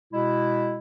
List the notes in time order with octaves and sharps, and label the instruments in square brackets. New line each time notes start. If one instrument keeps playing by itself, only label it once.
[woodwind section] B2 G#3 E4